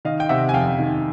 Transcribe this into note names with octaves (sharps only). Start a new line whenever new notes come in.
D#3 D#5 F5
G5
C3 E5 F#5
G#5
F2 F5 G5
D#3